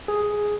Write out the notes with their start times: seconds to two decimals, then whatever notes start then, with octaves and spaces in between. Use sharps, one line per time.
0.08 G#4